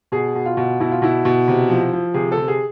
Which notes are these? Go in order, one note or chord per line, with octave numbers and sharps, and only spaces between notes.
B2 G#4
B2
F4
B2
B2 E4
F4
B2 E4
B2
C3
F3
F3
C3 G#4
A4
C3
G#4